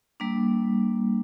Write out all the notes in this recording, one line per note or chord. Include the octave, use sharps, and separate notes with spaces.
G3 A#3 D4